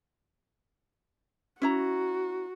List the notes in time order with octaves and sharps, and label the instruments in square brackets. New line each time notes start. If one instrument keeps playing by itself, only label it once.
[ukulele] C#4 E4 A#5 [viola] F#4